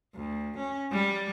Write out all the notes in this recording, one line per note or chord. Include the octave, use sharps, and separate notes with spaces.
D2
C#4
G3